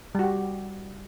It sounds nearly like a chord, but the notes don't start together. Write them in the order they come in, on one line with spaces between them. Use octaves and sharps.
G3 F#4 G4